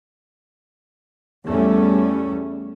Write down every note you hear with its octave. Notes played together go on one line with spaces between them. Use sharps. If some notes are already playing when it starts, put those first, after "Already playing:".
E2 G3 A3 C#4